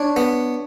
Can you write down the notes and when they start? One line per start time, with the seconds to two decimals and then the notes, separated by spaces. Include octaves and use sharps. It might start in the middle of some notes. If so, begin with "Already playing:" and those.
Already playing: D4 C#5
0.16 B3